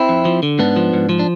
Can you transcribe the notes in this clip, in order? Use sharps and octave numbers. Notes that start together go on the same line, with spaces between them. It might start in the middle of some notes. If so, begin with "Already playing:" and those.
Already playing: C4 E4
F2
F3
D3
G#2 B3 D4
F3
G#2
F3
D4